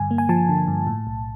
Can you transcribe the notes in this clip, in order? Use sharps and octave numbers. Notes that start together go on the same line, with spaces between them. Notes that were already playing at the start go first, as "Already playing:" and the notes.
Already playing: G2 D3 G#5
A#3
G#5
F3 A5
D3
G2
A2
B1